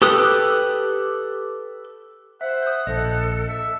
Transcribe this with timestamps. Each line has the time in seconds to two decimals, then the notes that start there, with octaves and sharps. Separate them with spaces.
0.02 G4 A4 B4 D#6
2.41 C5 E5 F#5
2.62 D#6 G6
2.87 A#1 A4 D#5
3.48 E5